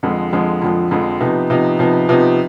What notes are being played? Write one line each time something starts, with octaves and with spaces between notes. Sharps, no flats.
F2 D3 F3 G#3
F2 D3 F3 G#3
F2 D3 F3 G#3
F2 D3 F3 G#3
C3 F3 B3 D#4
C3 F3 B3 D#4
C3 F3 B3 D#4
C3 F3 B3 D#4